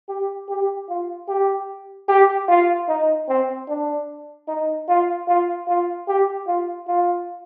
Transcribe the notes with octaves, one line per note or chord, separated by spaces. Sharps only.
G4
G4
F4
G4
G4
F4
D#4
C4
D4
D#4
F4
F4
F4
G4
F4
F4